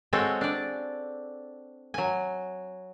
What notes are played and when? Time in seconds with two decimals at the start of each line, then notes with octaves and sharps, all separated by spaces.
0.13 G#3 C4 F#4 A4 C#5
0.41 D4 D5
1.94 F#3 G#5